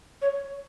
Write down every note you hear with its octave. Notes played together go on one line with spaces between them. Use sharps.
C#5